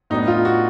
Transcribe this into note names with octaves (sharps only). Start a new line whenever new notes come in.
A2 F#3 B3 D4 D#4
F4
F#4